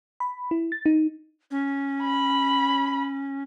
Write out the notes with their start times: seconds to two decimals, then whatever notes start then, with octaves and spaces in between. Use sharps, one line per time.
0.20 B5
0.51 E4
0.72 A6
0.86 D#4
1.51 C#4
2.02 B5